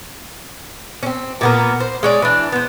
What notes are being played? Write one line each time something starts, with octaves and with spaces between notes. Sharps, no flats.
C4 C#4
A#2 B3 A#4
C5
G#3 C#5 D5
E3 D4
B3 C5